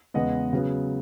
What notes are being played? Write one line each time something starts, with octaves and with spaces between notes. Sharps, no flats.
E2 C#3 G#3 B3 D#5 F#5
C#3 F#3 B3